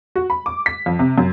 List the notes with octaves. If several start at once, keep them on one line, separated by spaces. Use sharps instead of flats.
F#4
B5
D6
B6
F2
C3
F#2